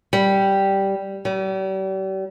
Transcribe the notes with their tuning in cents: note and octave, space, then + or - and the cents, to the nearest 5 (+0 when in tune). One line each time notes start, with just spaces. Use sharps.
G3 -5
G3 -40